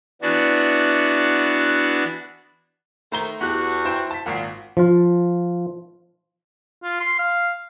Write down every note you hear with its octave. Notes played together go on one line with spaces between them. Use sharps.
E3 B3 D4 F#4
D#3 A3 C5 A#5 G7
E2 F#4 G4 F#6
E4 C5 G5
A5 B6
G#1 A#2 F#5
F3 F4
F4
C6
F5